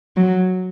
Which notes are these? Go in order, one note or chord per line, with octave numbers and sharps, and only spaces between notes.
F#3